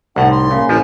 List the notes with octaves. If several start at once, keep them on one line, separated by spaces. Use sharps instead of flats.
C2 A2 D#4 F#5
C6
C#3 A#3
A1 F3 E4 C5